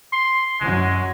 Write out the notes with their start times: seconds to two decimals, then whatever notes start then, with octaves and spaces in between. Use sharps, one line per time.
0.13 C6
0.61 F#2 F#3 G#3